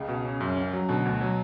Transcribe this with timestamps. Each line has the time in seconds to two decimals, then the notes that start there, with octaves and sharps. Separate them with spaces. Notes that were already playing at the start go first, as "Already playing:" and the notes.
Already playing: C#2 C#3
0.08 B2
0.25 C#4
0.40 F#2
0.57 C#4
0.73 F#3
0.89 B2 D3
1.05 D2
1.21 F#3